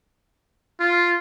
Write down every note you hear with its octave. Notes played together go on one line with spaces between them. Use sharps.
F4